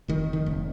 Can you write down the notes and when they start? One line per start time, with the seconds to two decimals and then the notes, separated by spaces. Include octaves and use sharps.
0.08 F1 D#3
0.33 D#3
0.46 F1